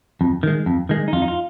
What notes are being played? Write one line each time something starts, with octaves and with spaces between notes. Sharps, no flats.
F2
D#3 G#3
F2
D#3 G#3
D#4
F2 F4
D#4
F4